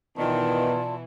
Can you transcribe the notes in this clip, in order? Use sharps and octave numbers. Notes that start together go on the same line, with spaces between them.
B2 D#3 E3 B3 E4 F4 D5 A5